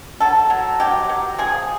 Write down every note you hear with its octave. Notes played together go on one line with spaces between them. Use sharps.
F#3 A4
F#3
F#3 G4
F#3
F3 G#4